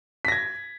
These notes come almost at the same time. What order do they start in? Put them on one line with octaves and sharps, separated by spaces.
B6 A#6 G#6